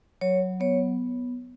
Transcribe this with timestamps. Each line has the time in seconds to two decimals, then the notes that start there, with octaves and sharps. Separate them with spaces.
0.21 F#3 C#5
0.60 B3 C#5